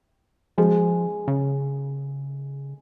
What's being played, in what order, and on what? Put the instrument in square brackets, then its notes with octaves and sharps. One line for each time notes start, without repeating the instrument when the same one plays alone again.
[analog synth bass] F3 [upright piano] G#3
[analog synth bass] C#3